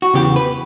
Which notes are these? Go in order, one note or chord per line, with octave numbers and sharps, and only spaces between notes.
F#4
E2 C#3 E3 G4
B4